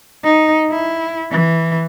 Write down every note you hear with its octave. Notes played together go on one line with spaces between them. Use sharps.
D#4
E4
E3